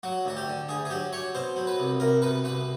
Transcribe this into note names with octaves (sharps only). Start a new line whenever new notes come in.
F#3 F#4
D2 F#4
G4
D3
D2 G#4
G#4
F#3 G4
F#3 C#5
B2 C5
F#3
B4
C2
C2 A#4
B2 B4
C2 B4